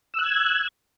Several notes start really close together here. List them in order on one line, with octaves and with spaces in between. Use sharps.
E6 F#6 G#6